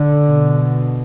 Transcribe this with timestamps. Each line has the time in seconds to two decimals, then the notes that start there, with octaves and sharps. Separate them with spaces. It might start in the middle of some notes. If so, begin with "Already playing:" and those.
Already playing: D3
0.23 B2